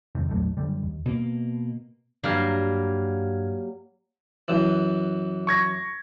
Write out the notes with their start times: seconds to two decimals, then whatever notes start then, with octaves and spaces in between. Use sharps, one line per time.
0.15 F2 G#2 C3 D#3
0.29 A#1 E2 F#3 A3
0.57 F#2 D3 G3
0.83 D#2
1.05 B2 A#3
2.23 G2 F#3 G3 A#3 F6 G#6
4.48 F#2 E3
5.47 C#6 G#6 A#6